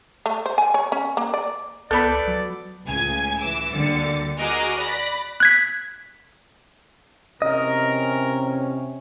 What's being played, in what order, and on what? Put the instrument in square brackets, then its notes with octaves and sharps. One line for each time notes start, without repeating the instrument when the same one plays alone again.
[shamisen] A3
C5
G#5
C#5
C#4
A#3
D5
[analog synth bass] C#2 [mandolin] B3 G6 [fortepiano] A4 B5 [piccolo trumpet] D5
[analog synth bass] F#3
[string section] C#2 A2 C#3 G#5 G#6
E3 D6 E6
D2 D3 G3 A#3 A6 C#7
F#4 G#4 A#4 D#5 D6
D5 B5 F#6 A#6
[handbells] F#6 G#6 B6
[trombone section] E2 C#4 [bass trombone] C3 [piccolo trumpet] A#4 [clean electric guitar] D#5